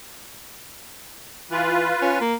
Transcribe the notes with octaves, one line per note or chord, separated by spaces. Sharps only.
E3 F4 B4
C#4
A#3